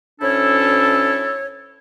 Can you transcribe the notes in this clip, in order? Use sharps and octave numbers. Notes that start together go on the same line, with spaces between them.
D2 C#4 D4 E4 A4 C#5